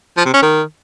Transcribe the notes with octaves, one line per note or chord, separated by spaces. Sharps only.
F3
C3
C#4
D#3